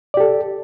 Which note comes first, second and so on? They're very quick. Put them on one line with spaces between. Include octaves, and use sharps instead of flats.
D5 G4 A4